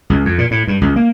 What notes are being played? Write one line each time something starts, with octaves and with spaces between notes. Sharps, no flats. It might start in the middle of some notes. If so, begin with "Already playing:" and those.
C#2
F2
A#2
A2
G2
C#2
A#3